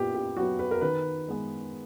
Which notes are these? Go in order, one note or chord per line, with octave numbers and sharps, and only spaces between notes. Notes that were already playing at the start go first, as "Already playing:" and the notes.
Already playing: A#2 B3 G4
G4
F#3 B3 F#4
B4
A#4
D#3 B4
G#3 B3